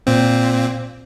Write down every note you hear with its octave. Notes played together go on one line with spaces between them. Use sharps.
A#2 C4